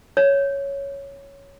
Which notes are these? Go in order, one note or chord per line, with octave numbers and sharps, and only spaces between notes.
C#5